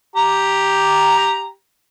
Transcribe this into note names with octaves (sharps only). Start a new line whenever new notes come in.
G4 A#5